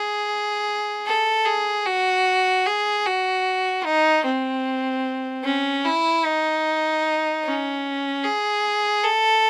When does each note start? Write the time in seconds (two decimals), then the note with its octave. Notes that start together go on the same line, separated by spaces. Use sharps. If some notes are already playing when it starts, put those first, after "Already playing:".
Already playing: G#4
1.06 A4
1.45 G#4
1.86 F#4
2.66 G#4
3.05 F#4
3.85 D#4
4.25 C4
5.44 C#4
5.85 E4
6.25 D#4
7.45 C#4
8.24 G#4
9.04 A4